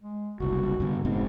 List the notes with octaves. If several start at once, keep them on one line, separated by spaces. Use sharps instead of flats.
G#3
F#1 C2 F#4
G2 D3
F1 G#2 B3 C4